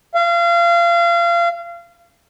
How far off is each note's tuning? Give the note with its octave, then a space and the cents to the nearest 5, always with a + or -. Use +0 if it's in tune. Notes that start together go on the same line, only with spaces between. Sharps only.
F5 -30